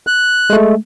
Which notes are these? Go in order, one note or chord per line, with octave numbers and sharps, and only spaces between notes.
F#6
G#3 A3